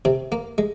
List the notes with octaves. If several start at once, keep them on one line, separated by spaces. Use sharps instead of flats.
C3 C4
A#3
G#3